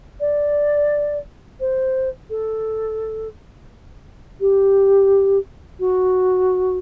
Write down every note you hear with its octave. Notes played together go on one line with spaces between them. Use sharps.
D5
C5
A4
G4
F#4